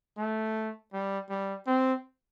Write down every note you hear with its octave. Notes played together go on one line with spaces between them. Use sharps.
A3
G3
G3
C4